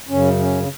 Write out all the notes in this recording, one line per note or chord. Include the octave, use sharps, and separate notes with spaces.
F#2 C#3 C#4
C#4